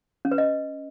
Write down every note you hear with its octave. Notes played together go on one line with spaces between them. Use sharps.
C#4
B4
D#5